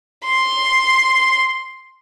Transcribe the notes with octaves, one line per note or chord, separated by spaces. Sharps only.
C6